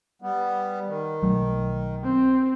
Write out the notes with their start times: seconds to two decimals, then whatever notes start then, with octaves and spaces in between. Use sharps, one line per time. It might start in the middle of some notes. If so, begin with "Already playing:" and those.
0.22 G3 B3
0.87 D#3
1.23 B1 F#3 A3
2.04 C4